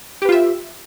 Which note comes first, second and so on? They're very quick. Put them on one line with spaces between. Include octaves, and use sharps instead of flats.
G4 B4 F4 E5